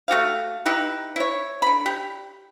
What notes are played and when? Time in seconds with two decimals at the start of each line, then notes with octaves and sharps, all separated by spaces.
0.08 A3 F#4 G4 F5
0.66 D#4 E4 G4 B4
1.16 E4 C#5
1.62 D3 B5
1.86 G4